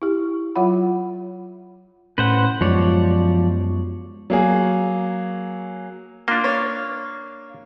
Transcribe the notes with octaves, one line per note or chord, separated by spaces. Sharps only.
E4 G4
F#3 F4 C#5 F#5 B5
A2 C#4 B4 C5 F#5
F#2 F3 G#3 B3 C#5 D5
F#3 A#3 G#4
A#3 D4 F4
C#5 F5